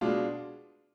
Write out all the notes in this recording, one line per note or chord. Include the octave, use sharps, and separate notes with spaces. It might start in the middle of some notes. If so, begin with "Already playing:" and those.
B2 G#3 D4 F4